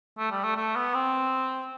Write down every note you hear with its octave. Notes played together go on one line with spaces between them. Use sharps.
A3
G3
A3
A3
B3
C4